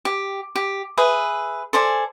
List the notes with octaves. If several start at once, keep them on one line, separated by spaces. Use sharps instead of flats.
G4
G4
G#4 B4 E5
A4 C5 D5 G#5